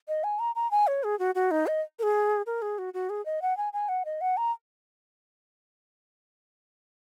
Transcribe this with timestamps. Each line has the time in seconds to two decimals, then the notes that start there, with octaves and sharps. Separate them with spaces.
0.08 D#5
0.24 G#5
0.39 A#5
0.55 A#5
0.71 G#5
0.87 C#5
1.04 G#4
1.19 F#4
1.35 F#4
1.51 D#4
1.67 D#5
1.99 A#4
2.03 G#4
2.46 A#4
2.62 G#4
2.78 F#4
2.94 F#4
3.10 G#4
3.26 D#5
3.42 F#5
3.57 G#5
3.73 G#5
3.89 F#5
4.05 D#5
4.21 F#5
4.37 A#5